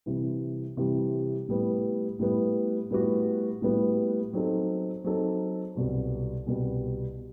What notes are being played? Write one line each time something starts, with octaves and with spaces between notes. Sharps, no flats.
C3 E3 G3
C3 E3 G3
A2 G3 B3
A2 G3 B3
A2 G3 B3 F#4
A2 G3 B3 F#4
F#3 C4 D#4 A4
F#3 C4 D#4 A4
C2 B2 G3
C2 B2 G3